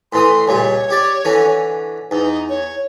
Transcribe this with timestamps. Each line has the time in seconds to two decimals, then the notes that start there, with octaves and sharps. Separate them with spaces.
0.13 A2 E3 C6 D#6
0.48 C#2 A#2 G3 C#5
0.90 G4 D5
1.25 D3 E3 C#4
2.11 E2 D#4
2.49 C#5